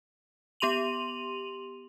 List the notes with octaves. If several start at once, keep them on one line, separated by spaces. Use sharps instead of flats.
B3 G4 C6 D#7 F7 F#7